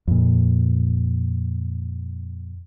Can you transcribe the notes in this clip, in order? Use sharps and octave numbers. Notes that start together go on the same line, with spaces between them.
F2 A#2